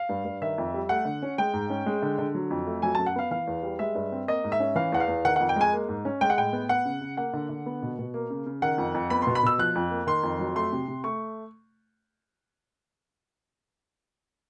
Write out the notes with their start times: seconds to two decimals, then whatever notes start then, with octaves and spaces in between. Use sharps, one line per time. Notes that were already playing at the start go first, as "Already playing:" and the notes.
Already playing: F5
0.09 G2
0.25 G2
0.42 D#3 E5
0.58 F2
0.74 G3
0.89 A3 F#5
1.05 D3
1.23 C#4
1.38 G#3 G5
1.54 G#2
1.70 C#4
1.86 G#3
2.02 D3
2.19 D3
2.35 F#3
2.51 F2
2.67 A3
2.82 F#3 G#5
2.95 F#2 A5
3.06 F#5
3.16 B3 F5
3.31 E3 F5
3.47 E2
3.63 G3
3.79 G#3 E5
3.95 G2
4.12 C4
4.28 A#3 D#5
4.44 G#2
4.52 E5
4.60 C#4
4.75 E3 F5
4.92 E2 F#5
5.00 F5
5.08 E2
5.25 D#3 F#5
5.36 F2 F#5
5.49 G5
5.56 G#3 G#5
5.73 A#3
5.89 G#2
6.05 C#4
6.21 G#3 G5
6.30 F#5
6.37 A2 G5
6.53 B3
6.69 B3 F#5
6.85 C#3
7.01 C#3
7.17 A#3 F#5
7.34 D3
7.49 D3
7.66 B3
7.83 B2
7.99 B2
8.14 A#3
8.30 C#3
8.46 C#3
8.62 D#3 F#5
8.78 F2
8.94 F2
9.10 B3 B5
9.22 B2 C6
9.35 B5
9.43 B2 E6
9.58 F3 F#6
9.75 F2
9.91 A#3
10.07 D#3 C6
10.23 F2
10.40 F#3
10.55 A3 C6
10.72 C3
10.88 C3
11.04 A3 C#6